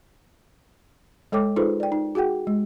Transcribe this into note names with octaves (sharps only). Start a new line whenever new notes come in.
G#3 A4 C#5 G5 D6
D#4 F4 G#4 A4 B4 C5
D5 G5
D#4
F#4 G#4 F#5 G5
G#3